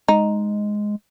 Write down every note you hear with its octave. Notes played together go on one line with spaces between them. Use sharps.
G#3 D#4